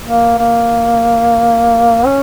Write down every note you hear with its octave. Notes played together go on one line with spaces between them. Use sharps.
A#3
A#3
C#4